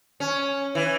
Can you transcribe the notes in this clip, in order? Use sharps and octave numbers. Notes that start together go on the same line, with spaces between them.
C#4
E3